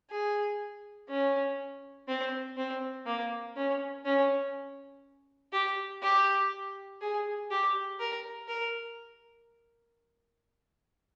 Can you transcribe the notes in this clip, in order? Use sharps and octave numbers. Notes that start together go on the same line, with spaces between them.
G#4
C#4
C4
C4
A#3
C#4
C#4
G4
G4
G#4
G4
A#4
A#4